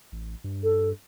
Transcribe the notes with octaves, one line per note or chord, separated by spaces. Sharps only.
A1
G2
A4